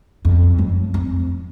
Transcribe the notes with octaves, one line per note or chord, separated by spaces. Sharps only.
F2
F#2
F2